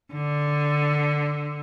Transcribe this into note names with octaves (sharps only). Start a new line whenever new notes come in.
D3